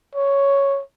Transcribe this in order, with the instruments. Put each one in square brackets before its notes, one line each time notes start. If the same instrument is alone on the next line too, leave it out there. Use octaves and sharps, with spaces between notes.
[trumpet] C#5